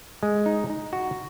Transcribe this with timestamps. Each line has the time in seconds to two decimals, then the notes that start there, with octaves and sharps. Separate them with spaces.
0.23 G#3
0.46 D#4
0.70 D#4
0.93 F#4